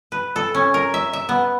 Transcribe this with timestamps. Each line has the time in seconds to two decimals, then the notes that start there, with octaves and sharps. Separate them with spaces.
0.12 B4
0.36 A4
0.55 C#4
0.74 A#4
0.94 E5
1.13 E5
1.29 B3